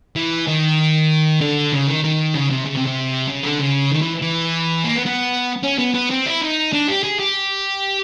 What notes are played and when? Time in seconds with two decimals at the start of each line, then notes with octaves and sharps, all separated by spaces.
0.16 E3
0.47 D#3
1.41 D3
1.73 C#3
1.88 D#3
2.04 D#3
2.35 C#3
2.50 C3
2.66 C#3
2.77 C3
2.87 C3
3.29 C#3
3.44 D3
3.59 C#3
3.91 D#3
4.02 E3
4.22 E3
4.85 A#3
4.95 B3
5.06 B3
5.63 C#4
5.79 B3
5.94 B3
6.10 C4
6.26 E4
6.41 D#4
6.73 D4
6.88 G4
7.04 G#4
7.20 G4